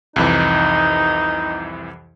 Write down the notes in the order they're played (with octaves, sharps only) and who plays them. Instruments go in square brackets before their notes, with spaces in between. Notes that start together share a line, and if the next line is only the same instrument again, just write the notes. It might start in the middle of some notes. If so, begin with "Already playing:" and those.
[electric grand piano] C2 F2 E3 [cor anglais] D#4